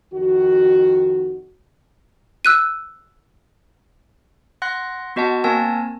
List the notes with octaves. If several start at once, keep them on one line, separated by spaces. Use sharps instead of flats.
F2 D#3 F#4
E6 F#6 D#7
F#5 C6 F#6 A#6
B3 F#4 D#5 F#5 A5
A#3 C4 A#4 G#5 A5 A#6